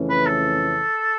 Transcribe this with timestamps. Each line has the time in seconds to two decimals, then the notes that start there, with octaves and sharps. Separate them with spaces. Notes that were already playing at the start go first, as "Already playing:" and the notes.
Already playing: F2 C#3 E3 A3 C#4
0.10 B4
0.26 A4